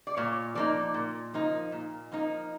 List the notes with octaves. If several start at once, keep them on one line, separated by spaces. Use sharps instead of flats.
D5
A#2 C#5
F3 A#3 D#4 D5
A#2
F3 A#3 D#4
A#2
F3 A#3 D#4